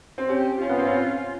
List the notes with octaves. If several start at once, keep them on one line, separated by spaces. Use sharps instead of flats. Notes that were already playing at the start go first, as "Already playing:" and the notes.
C4
C#4 G4
C#4 F4
B3
C4
C#4